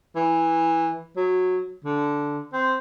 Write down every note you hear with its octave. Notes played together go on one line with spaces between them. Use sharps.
E3
F#3
D3
C4